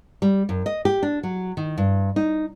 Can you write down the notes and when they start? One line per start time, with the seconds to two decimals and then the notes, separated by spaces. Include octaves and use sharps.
0.22 G3
0.49 F#2
0.66 D#5
0.85 G4
1.03 D4
1.23 F#3
1.57 D#3
1.78 G2
2.16 D#4